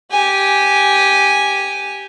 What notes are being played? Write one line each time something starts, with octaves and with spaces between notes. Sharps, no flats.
G4 G#5